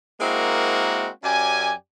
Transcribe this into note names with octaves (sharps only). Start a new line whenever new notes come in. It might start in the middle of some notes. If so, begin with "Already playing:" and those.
G#3 A#3 C4 E4 F#4 A#4
F#2 C#4 G4 D5 G#5